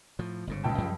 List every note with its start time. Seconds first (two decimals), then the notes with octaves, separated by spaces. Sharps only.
0.19 A2 F3
0.47 G1 G#2 C#3
0.64 C#2 G5 A5
0.78 F#2 F3 G3